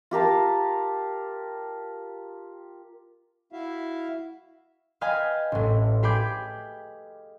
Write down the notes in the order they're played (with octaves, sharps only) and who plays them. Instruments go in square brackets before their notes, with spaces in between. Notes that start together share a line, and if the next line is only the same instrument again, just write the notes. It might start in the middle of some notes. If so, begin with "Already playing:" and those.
[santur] F4 G4 A#4 A5
[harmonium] E4 F#4 E5 F5
[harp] B4 D#5 F5 G5 G#5 B5
A1 A2
G4 G#4 B5 D6 G6